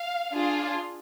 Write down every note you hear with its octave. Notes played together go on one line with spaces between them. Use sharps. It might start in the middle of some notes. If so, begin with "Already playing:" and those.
Already playing: F5
D4 F4 G#4